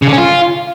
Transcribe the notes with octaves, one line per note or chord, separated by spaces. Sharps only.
C#3
D3
C#4
F4